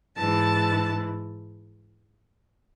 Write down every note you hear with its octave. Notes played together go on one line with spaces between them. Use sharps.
G#2 E3 A5